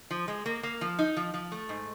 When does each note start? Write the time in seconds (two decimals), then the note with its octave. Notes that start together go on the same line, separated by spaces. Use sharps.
0.11 F3
0.28 G#3
0.46 A#3
0.63 A#3
0.81 F3
0.99 D#4
1.17 F3
1.34 F3
1.52 A3
1.69 G#2